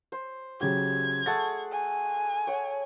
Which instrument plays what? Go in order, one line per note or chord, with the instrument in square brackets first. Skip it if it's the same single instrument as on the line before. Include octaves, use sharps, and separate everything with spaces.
[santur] C5
[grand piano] C#3 F#3 G4 [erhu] G#6
[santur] A3 G#4 F#5 [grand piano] A6
[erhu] G#5
[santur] C#5 F#5